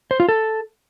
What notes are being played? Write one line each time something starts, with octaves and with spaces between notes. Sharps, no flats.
C5
F4
A4